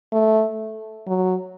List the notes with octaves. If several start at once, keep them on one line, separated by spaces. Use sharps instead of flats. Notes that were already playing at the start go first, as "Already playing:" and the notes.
A3
F#3